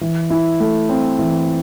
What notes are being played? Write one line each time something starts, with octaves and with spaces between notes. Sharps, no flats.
E3
E4
A3
C4
E3